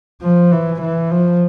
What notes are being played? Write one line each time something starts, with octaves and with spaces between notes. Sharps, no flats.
F3
E3
E3
F3